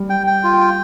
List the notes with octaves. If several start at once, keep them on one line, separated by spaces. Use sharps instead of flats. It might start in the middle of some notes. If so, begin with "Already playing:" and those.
Already playing: G3
G5
G5
F4
G5